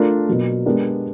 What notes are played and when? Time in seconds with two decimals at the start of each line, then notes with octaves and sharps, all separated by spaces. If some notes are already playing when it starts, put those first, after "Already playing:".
Already playing: A3 D4 F4 A#4
0.27 B2 F#3 A#3
0.66 G#3 B3 D4 G4 A#4